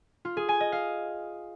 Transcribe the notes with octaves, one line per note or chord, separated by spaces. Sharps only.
F4
G#4
G#5
D#5
F5